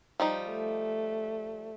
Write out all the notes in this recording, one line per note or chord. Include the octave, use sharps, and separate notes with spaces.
F3 G3 D#4
A3